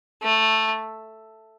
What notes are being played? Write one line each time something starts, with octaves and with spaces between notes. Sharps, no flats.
A3